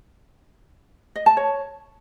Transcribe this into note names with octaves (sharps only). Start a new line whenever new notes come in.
D#5
A5
C#5